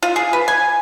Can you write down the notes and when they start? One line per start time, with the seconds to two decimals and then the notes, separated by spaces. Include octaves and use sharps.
0.02 F4
0.16 G#4
0.33 B4
0.48 G#5